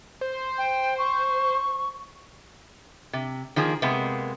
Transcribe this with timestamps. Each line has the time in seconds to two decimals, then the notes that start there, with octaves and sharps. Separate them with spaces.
0.21 C5
0.58 G5
0.98 C#6
3.13 C3
3.56 D#3 F3 A#3 G#4
3.82 C3 G#3 A#3 B3